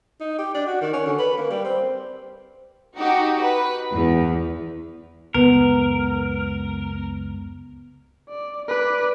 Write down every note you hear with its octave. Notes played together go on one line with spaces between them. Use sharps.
D#4
G4
D4
F#4
D#3
C#4
D3
B4
A#3
G3
C4
D#4 F#4 G4
B4
E2
C#2 F#2 B3 A#4
D5
B4 D5